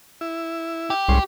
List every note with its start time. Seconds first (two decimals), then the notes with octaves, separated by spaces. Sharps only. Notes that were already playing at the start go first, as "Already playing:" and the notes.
0.21 E4
0.90 G4
1.09 C2 G#2 C#4 C6